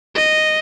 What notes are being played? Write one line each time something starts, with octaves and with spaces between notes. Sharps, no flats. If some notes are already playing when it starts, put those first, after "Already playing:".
D#5